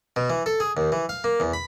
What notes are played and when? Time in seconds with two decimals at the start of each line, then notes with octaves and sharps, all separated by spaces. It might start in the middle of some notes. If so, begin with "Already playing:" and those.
0.16 B2
0.30 E3
0.46 A4
0.60 G#4
0.77 D#2
0.92 E3
1.09 F5
1.24 A#3
1.40 E2
1.53 B5